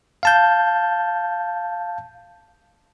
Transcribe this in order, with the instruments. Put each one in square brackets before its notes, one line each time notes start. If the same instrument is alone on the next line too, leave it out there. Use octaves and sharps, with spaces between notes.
[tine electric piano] F5 A5 G6